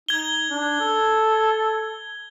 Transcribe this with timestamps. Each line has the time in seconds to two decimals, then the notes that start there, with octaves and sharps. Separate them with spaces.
0.09 D#4 G#6 G7
0.50 D4
0.80 A4